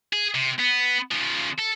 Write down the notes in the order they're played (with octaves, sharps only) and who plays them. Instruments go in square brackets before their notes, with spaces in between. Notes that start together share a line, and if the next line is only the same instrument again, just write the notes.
[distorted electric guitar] G#4
C3
B3
C#3 F3
A4